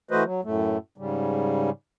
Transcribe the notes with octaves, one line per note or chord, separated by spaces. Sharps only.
E3 A3 F#4 B4 C5 D#5
F#3
F#2 A2 A3
G#2 C#3 G3